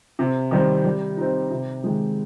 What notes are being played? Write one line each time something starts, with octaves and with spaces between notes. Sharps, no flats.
C3
D#3 G3 C4
G3
C4 D#4
C3
D#3 G#3